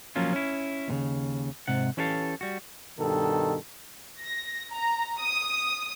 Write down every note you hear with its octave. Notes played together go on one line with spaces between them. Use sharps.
F3 F#3 A#3 C#4 F4
C#4 E4
D#2 A2 C#3
G#2 C3 F#5
E3 C#4 E4 G4 A4 F5
G3 F#4
G2 B2 D#3 A4
A#6
A#5
D#6